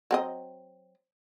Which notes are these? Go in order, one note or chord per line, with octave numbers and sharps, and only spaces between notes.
F#3 C4 D#5